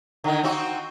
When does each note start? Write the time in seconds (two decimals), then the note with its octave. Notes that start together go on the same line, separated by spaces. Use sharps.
0.24 D3 D#3
0.44 C4 D#4 F#4